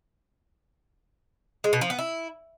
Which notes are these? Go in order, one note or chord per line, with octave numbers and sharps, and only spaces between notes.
G#3
B2
F3
B3
E4